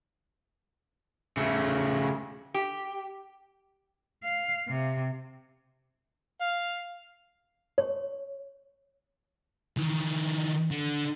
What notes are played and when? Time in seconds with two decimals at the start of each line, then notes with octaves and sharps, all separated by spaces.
1.37 C#3 A3
2.54 G4
4.24 F5
4.69 C3
6.41 F5
7.78 C#5
9.77 D#3 E3
10.71 D3